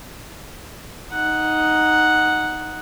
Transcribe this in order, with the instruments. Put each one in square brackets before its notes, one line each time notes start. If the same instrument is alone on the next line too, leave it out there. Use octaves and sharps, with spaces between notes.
[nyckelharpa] D#4 F#5